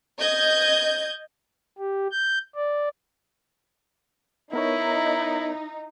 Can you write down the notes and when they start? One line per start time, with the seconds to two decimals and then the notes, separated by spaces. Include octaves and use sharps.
0.19 D#5 G6 G#6
1.78 G4
2.11 G6
2.55 D5
4.53 B3 D#4 E4 A#4 C#5